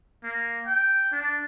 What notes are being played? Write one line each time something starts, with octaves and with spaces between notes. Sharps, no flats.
A#3
G5
D4